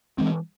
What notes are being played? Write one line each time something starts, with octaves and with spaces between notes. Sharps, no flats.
E3 G#3 C4